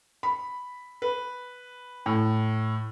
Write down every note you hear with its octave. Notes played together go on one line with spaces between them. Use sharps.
B5
B4
A2